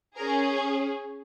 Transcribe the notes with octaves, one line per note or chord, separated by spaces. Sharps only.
C#4 G#4 A#4